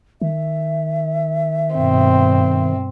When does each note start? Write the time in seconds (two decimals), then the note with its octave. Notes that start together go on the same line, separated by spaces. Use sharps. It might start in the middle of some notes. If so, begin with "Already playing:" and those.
0.22 D#3 E5
1.75 G2 B2 C4